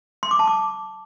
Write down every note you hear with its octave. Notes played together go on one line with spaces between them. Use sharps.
C6
D6
A5
D6